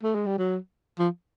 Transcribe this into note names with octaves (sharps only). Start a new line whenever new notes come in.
A3
G#3
G3
F#3
F3